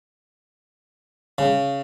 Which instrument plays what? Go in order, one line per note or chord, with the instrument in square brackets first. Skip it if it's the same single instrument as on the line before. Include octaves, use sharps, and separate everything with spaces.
[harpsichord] C#3